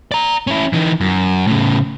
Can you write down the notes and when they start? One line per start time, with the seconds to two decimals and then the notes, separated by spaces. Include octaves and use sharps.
0.12 D5 A#5
0.47 C#4 E4
0.73 E3 D#4
1.01 F#2
1.47 A2 C#3